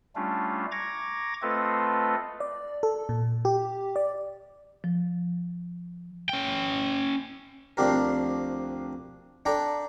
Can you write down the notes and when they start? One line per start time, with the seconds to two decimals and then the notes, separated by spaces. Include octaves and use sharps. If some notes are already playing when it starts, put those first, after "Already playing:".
0.16 G3 A3 C#4 D4 F4
0.72 A#5 C#6 D6 G#6 A#6
1.42 A3 C4 F4 A4 B4 D#5
2.40 D5
2.83 A4
3.09 A#2
3.45 G4
3.96 D5
4.84 F3
6.29 C#4 G5
7.77 D2 F3 C4 D4 G4 A#4
9.46 D4 A4 G5 A#5